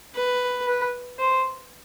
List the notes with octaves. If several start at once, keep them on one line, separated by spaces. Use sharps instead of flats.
B4
B4
C5